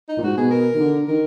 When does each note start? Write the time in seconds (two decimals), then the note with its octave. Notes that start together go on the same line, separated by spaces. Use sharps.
0.09 D#4
0.18 A#2
0.23 G#2 F#4
0.37 B2 G#4
0.51 A#4
0.75 D#3
0.80 D3
1.08 D#3 A#4